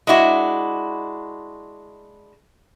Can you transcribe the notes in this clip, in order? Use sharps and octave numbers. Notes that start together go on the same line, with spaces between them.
G#3 D4 E4 F#4